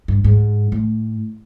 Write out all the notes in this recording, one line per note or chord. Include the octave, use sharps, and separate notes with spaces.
G2
G#2
A2